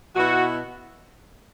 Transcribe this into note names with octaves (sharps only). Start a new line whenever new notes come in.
B2 B3 E4 F#4